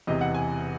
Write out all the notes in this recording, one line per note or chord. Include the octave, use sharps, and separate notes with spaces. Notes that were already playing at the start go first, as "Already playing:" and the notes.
E1 E2 C3 D#5
F#5
G#5